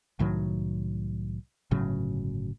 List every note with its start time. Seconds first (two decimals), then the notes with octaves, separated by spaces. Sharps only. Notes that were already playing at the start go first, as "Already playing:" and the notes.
0.19 C2 A2 D#3 F#3
1.71 G1 A2 C#3 F#3